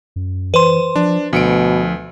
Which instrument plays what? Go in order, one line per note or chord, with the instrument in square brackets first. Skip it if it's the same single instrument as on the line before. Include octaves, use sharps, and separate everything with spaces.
[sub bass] F#2
[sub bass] E3 [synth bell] B4 C5 C6
[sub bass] F3 [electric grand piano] D4
[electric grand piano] D2 C#7 D7 [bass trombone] B2 [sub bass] F3